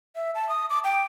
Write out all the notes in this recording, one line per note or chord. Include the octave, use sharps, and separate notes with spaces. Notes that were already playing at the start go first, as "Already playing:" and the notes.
E5
A5
D#6
D6
G5